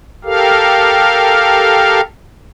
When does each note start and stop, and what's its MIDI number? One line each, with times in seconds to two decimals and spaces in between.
0.25 2.01 67
0.25 2.01 69
0.25 2.01 70
0.25 2.01 77